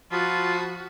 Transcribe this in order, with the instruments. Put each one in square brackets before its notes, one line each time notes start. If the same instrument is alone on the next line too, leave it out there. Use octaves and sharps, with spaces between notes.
[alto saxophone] F3 [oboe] F4 [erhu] F#4 [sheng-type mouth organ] A5 B5 D#6